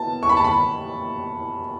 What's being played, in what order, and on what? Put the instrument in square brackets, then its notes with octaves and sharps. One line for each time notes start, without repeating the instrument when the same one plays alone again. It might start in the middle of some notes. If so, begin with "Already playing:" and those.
Already playing: [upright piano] B2 B3 E4 A5
C#6
B5
A5
B5